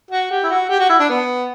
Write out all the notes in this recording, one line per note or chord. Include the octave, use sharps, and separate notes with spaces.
F#4
G4
E4
F#4
G4
F#4
E4
D4
B3